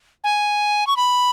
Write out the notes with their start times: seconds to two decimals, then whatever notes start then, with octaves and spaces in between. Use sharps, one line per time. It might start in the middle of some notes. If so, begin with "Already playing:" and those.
0.24 G#5
0.87 C#6
0.96 B5